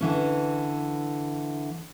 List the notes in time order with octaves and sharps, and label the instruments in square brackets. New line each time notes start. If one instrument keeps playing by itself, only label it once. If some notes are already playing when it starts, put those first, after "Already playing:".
[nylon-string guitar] D3 E3 C#4